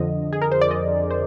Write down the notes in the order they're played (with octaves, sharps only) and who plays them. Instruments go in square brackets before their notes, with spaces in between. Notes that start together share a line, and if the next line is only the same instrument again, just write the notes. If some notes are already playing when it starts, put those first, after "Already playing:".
Already playing: [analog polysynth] F2 D3 F3 D#5
G#4
A#4
C5
D5
D#5
C5